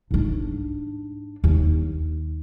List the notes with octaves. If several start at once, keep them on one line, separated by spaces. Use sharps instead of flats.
G#2 D4
D#2